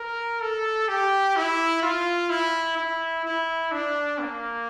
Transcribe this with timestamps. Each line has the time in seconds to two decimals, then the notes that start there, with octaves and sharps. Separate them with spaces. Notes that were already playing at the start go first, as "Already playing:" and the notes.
Already playing: A#4
0.41 A4
0.88 G4
1.36 E4
1.83 F4
2.30 E4
2.77 E4
3.25 E4
3.72 D4
4.20 A#3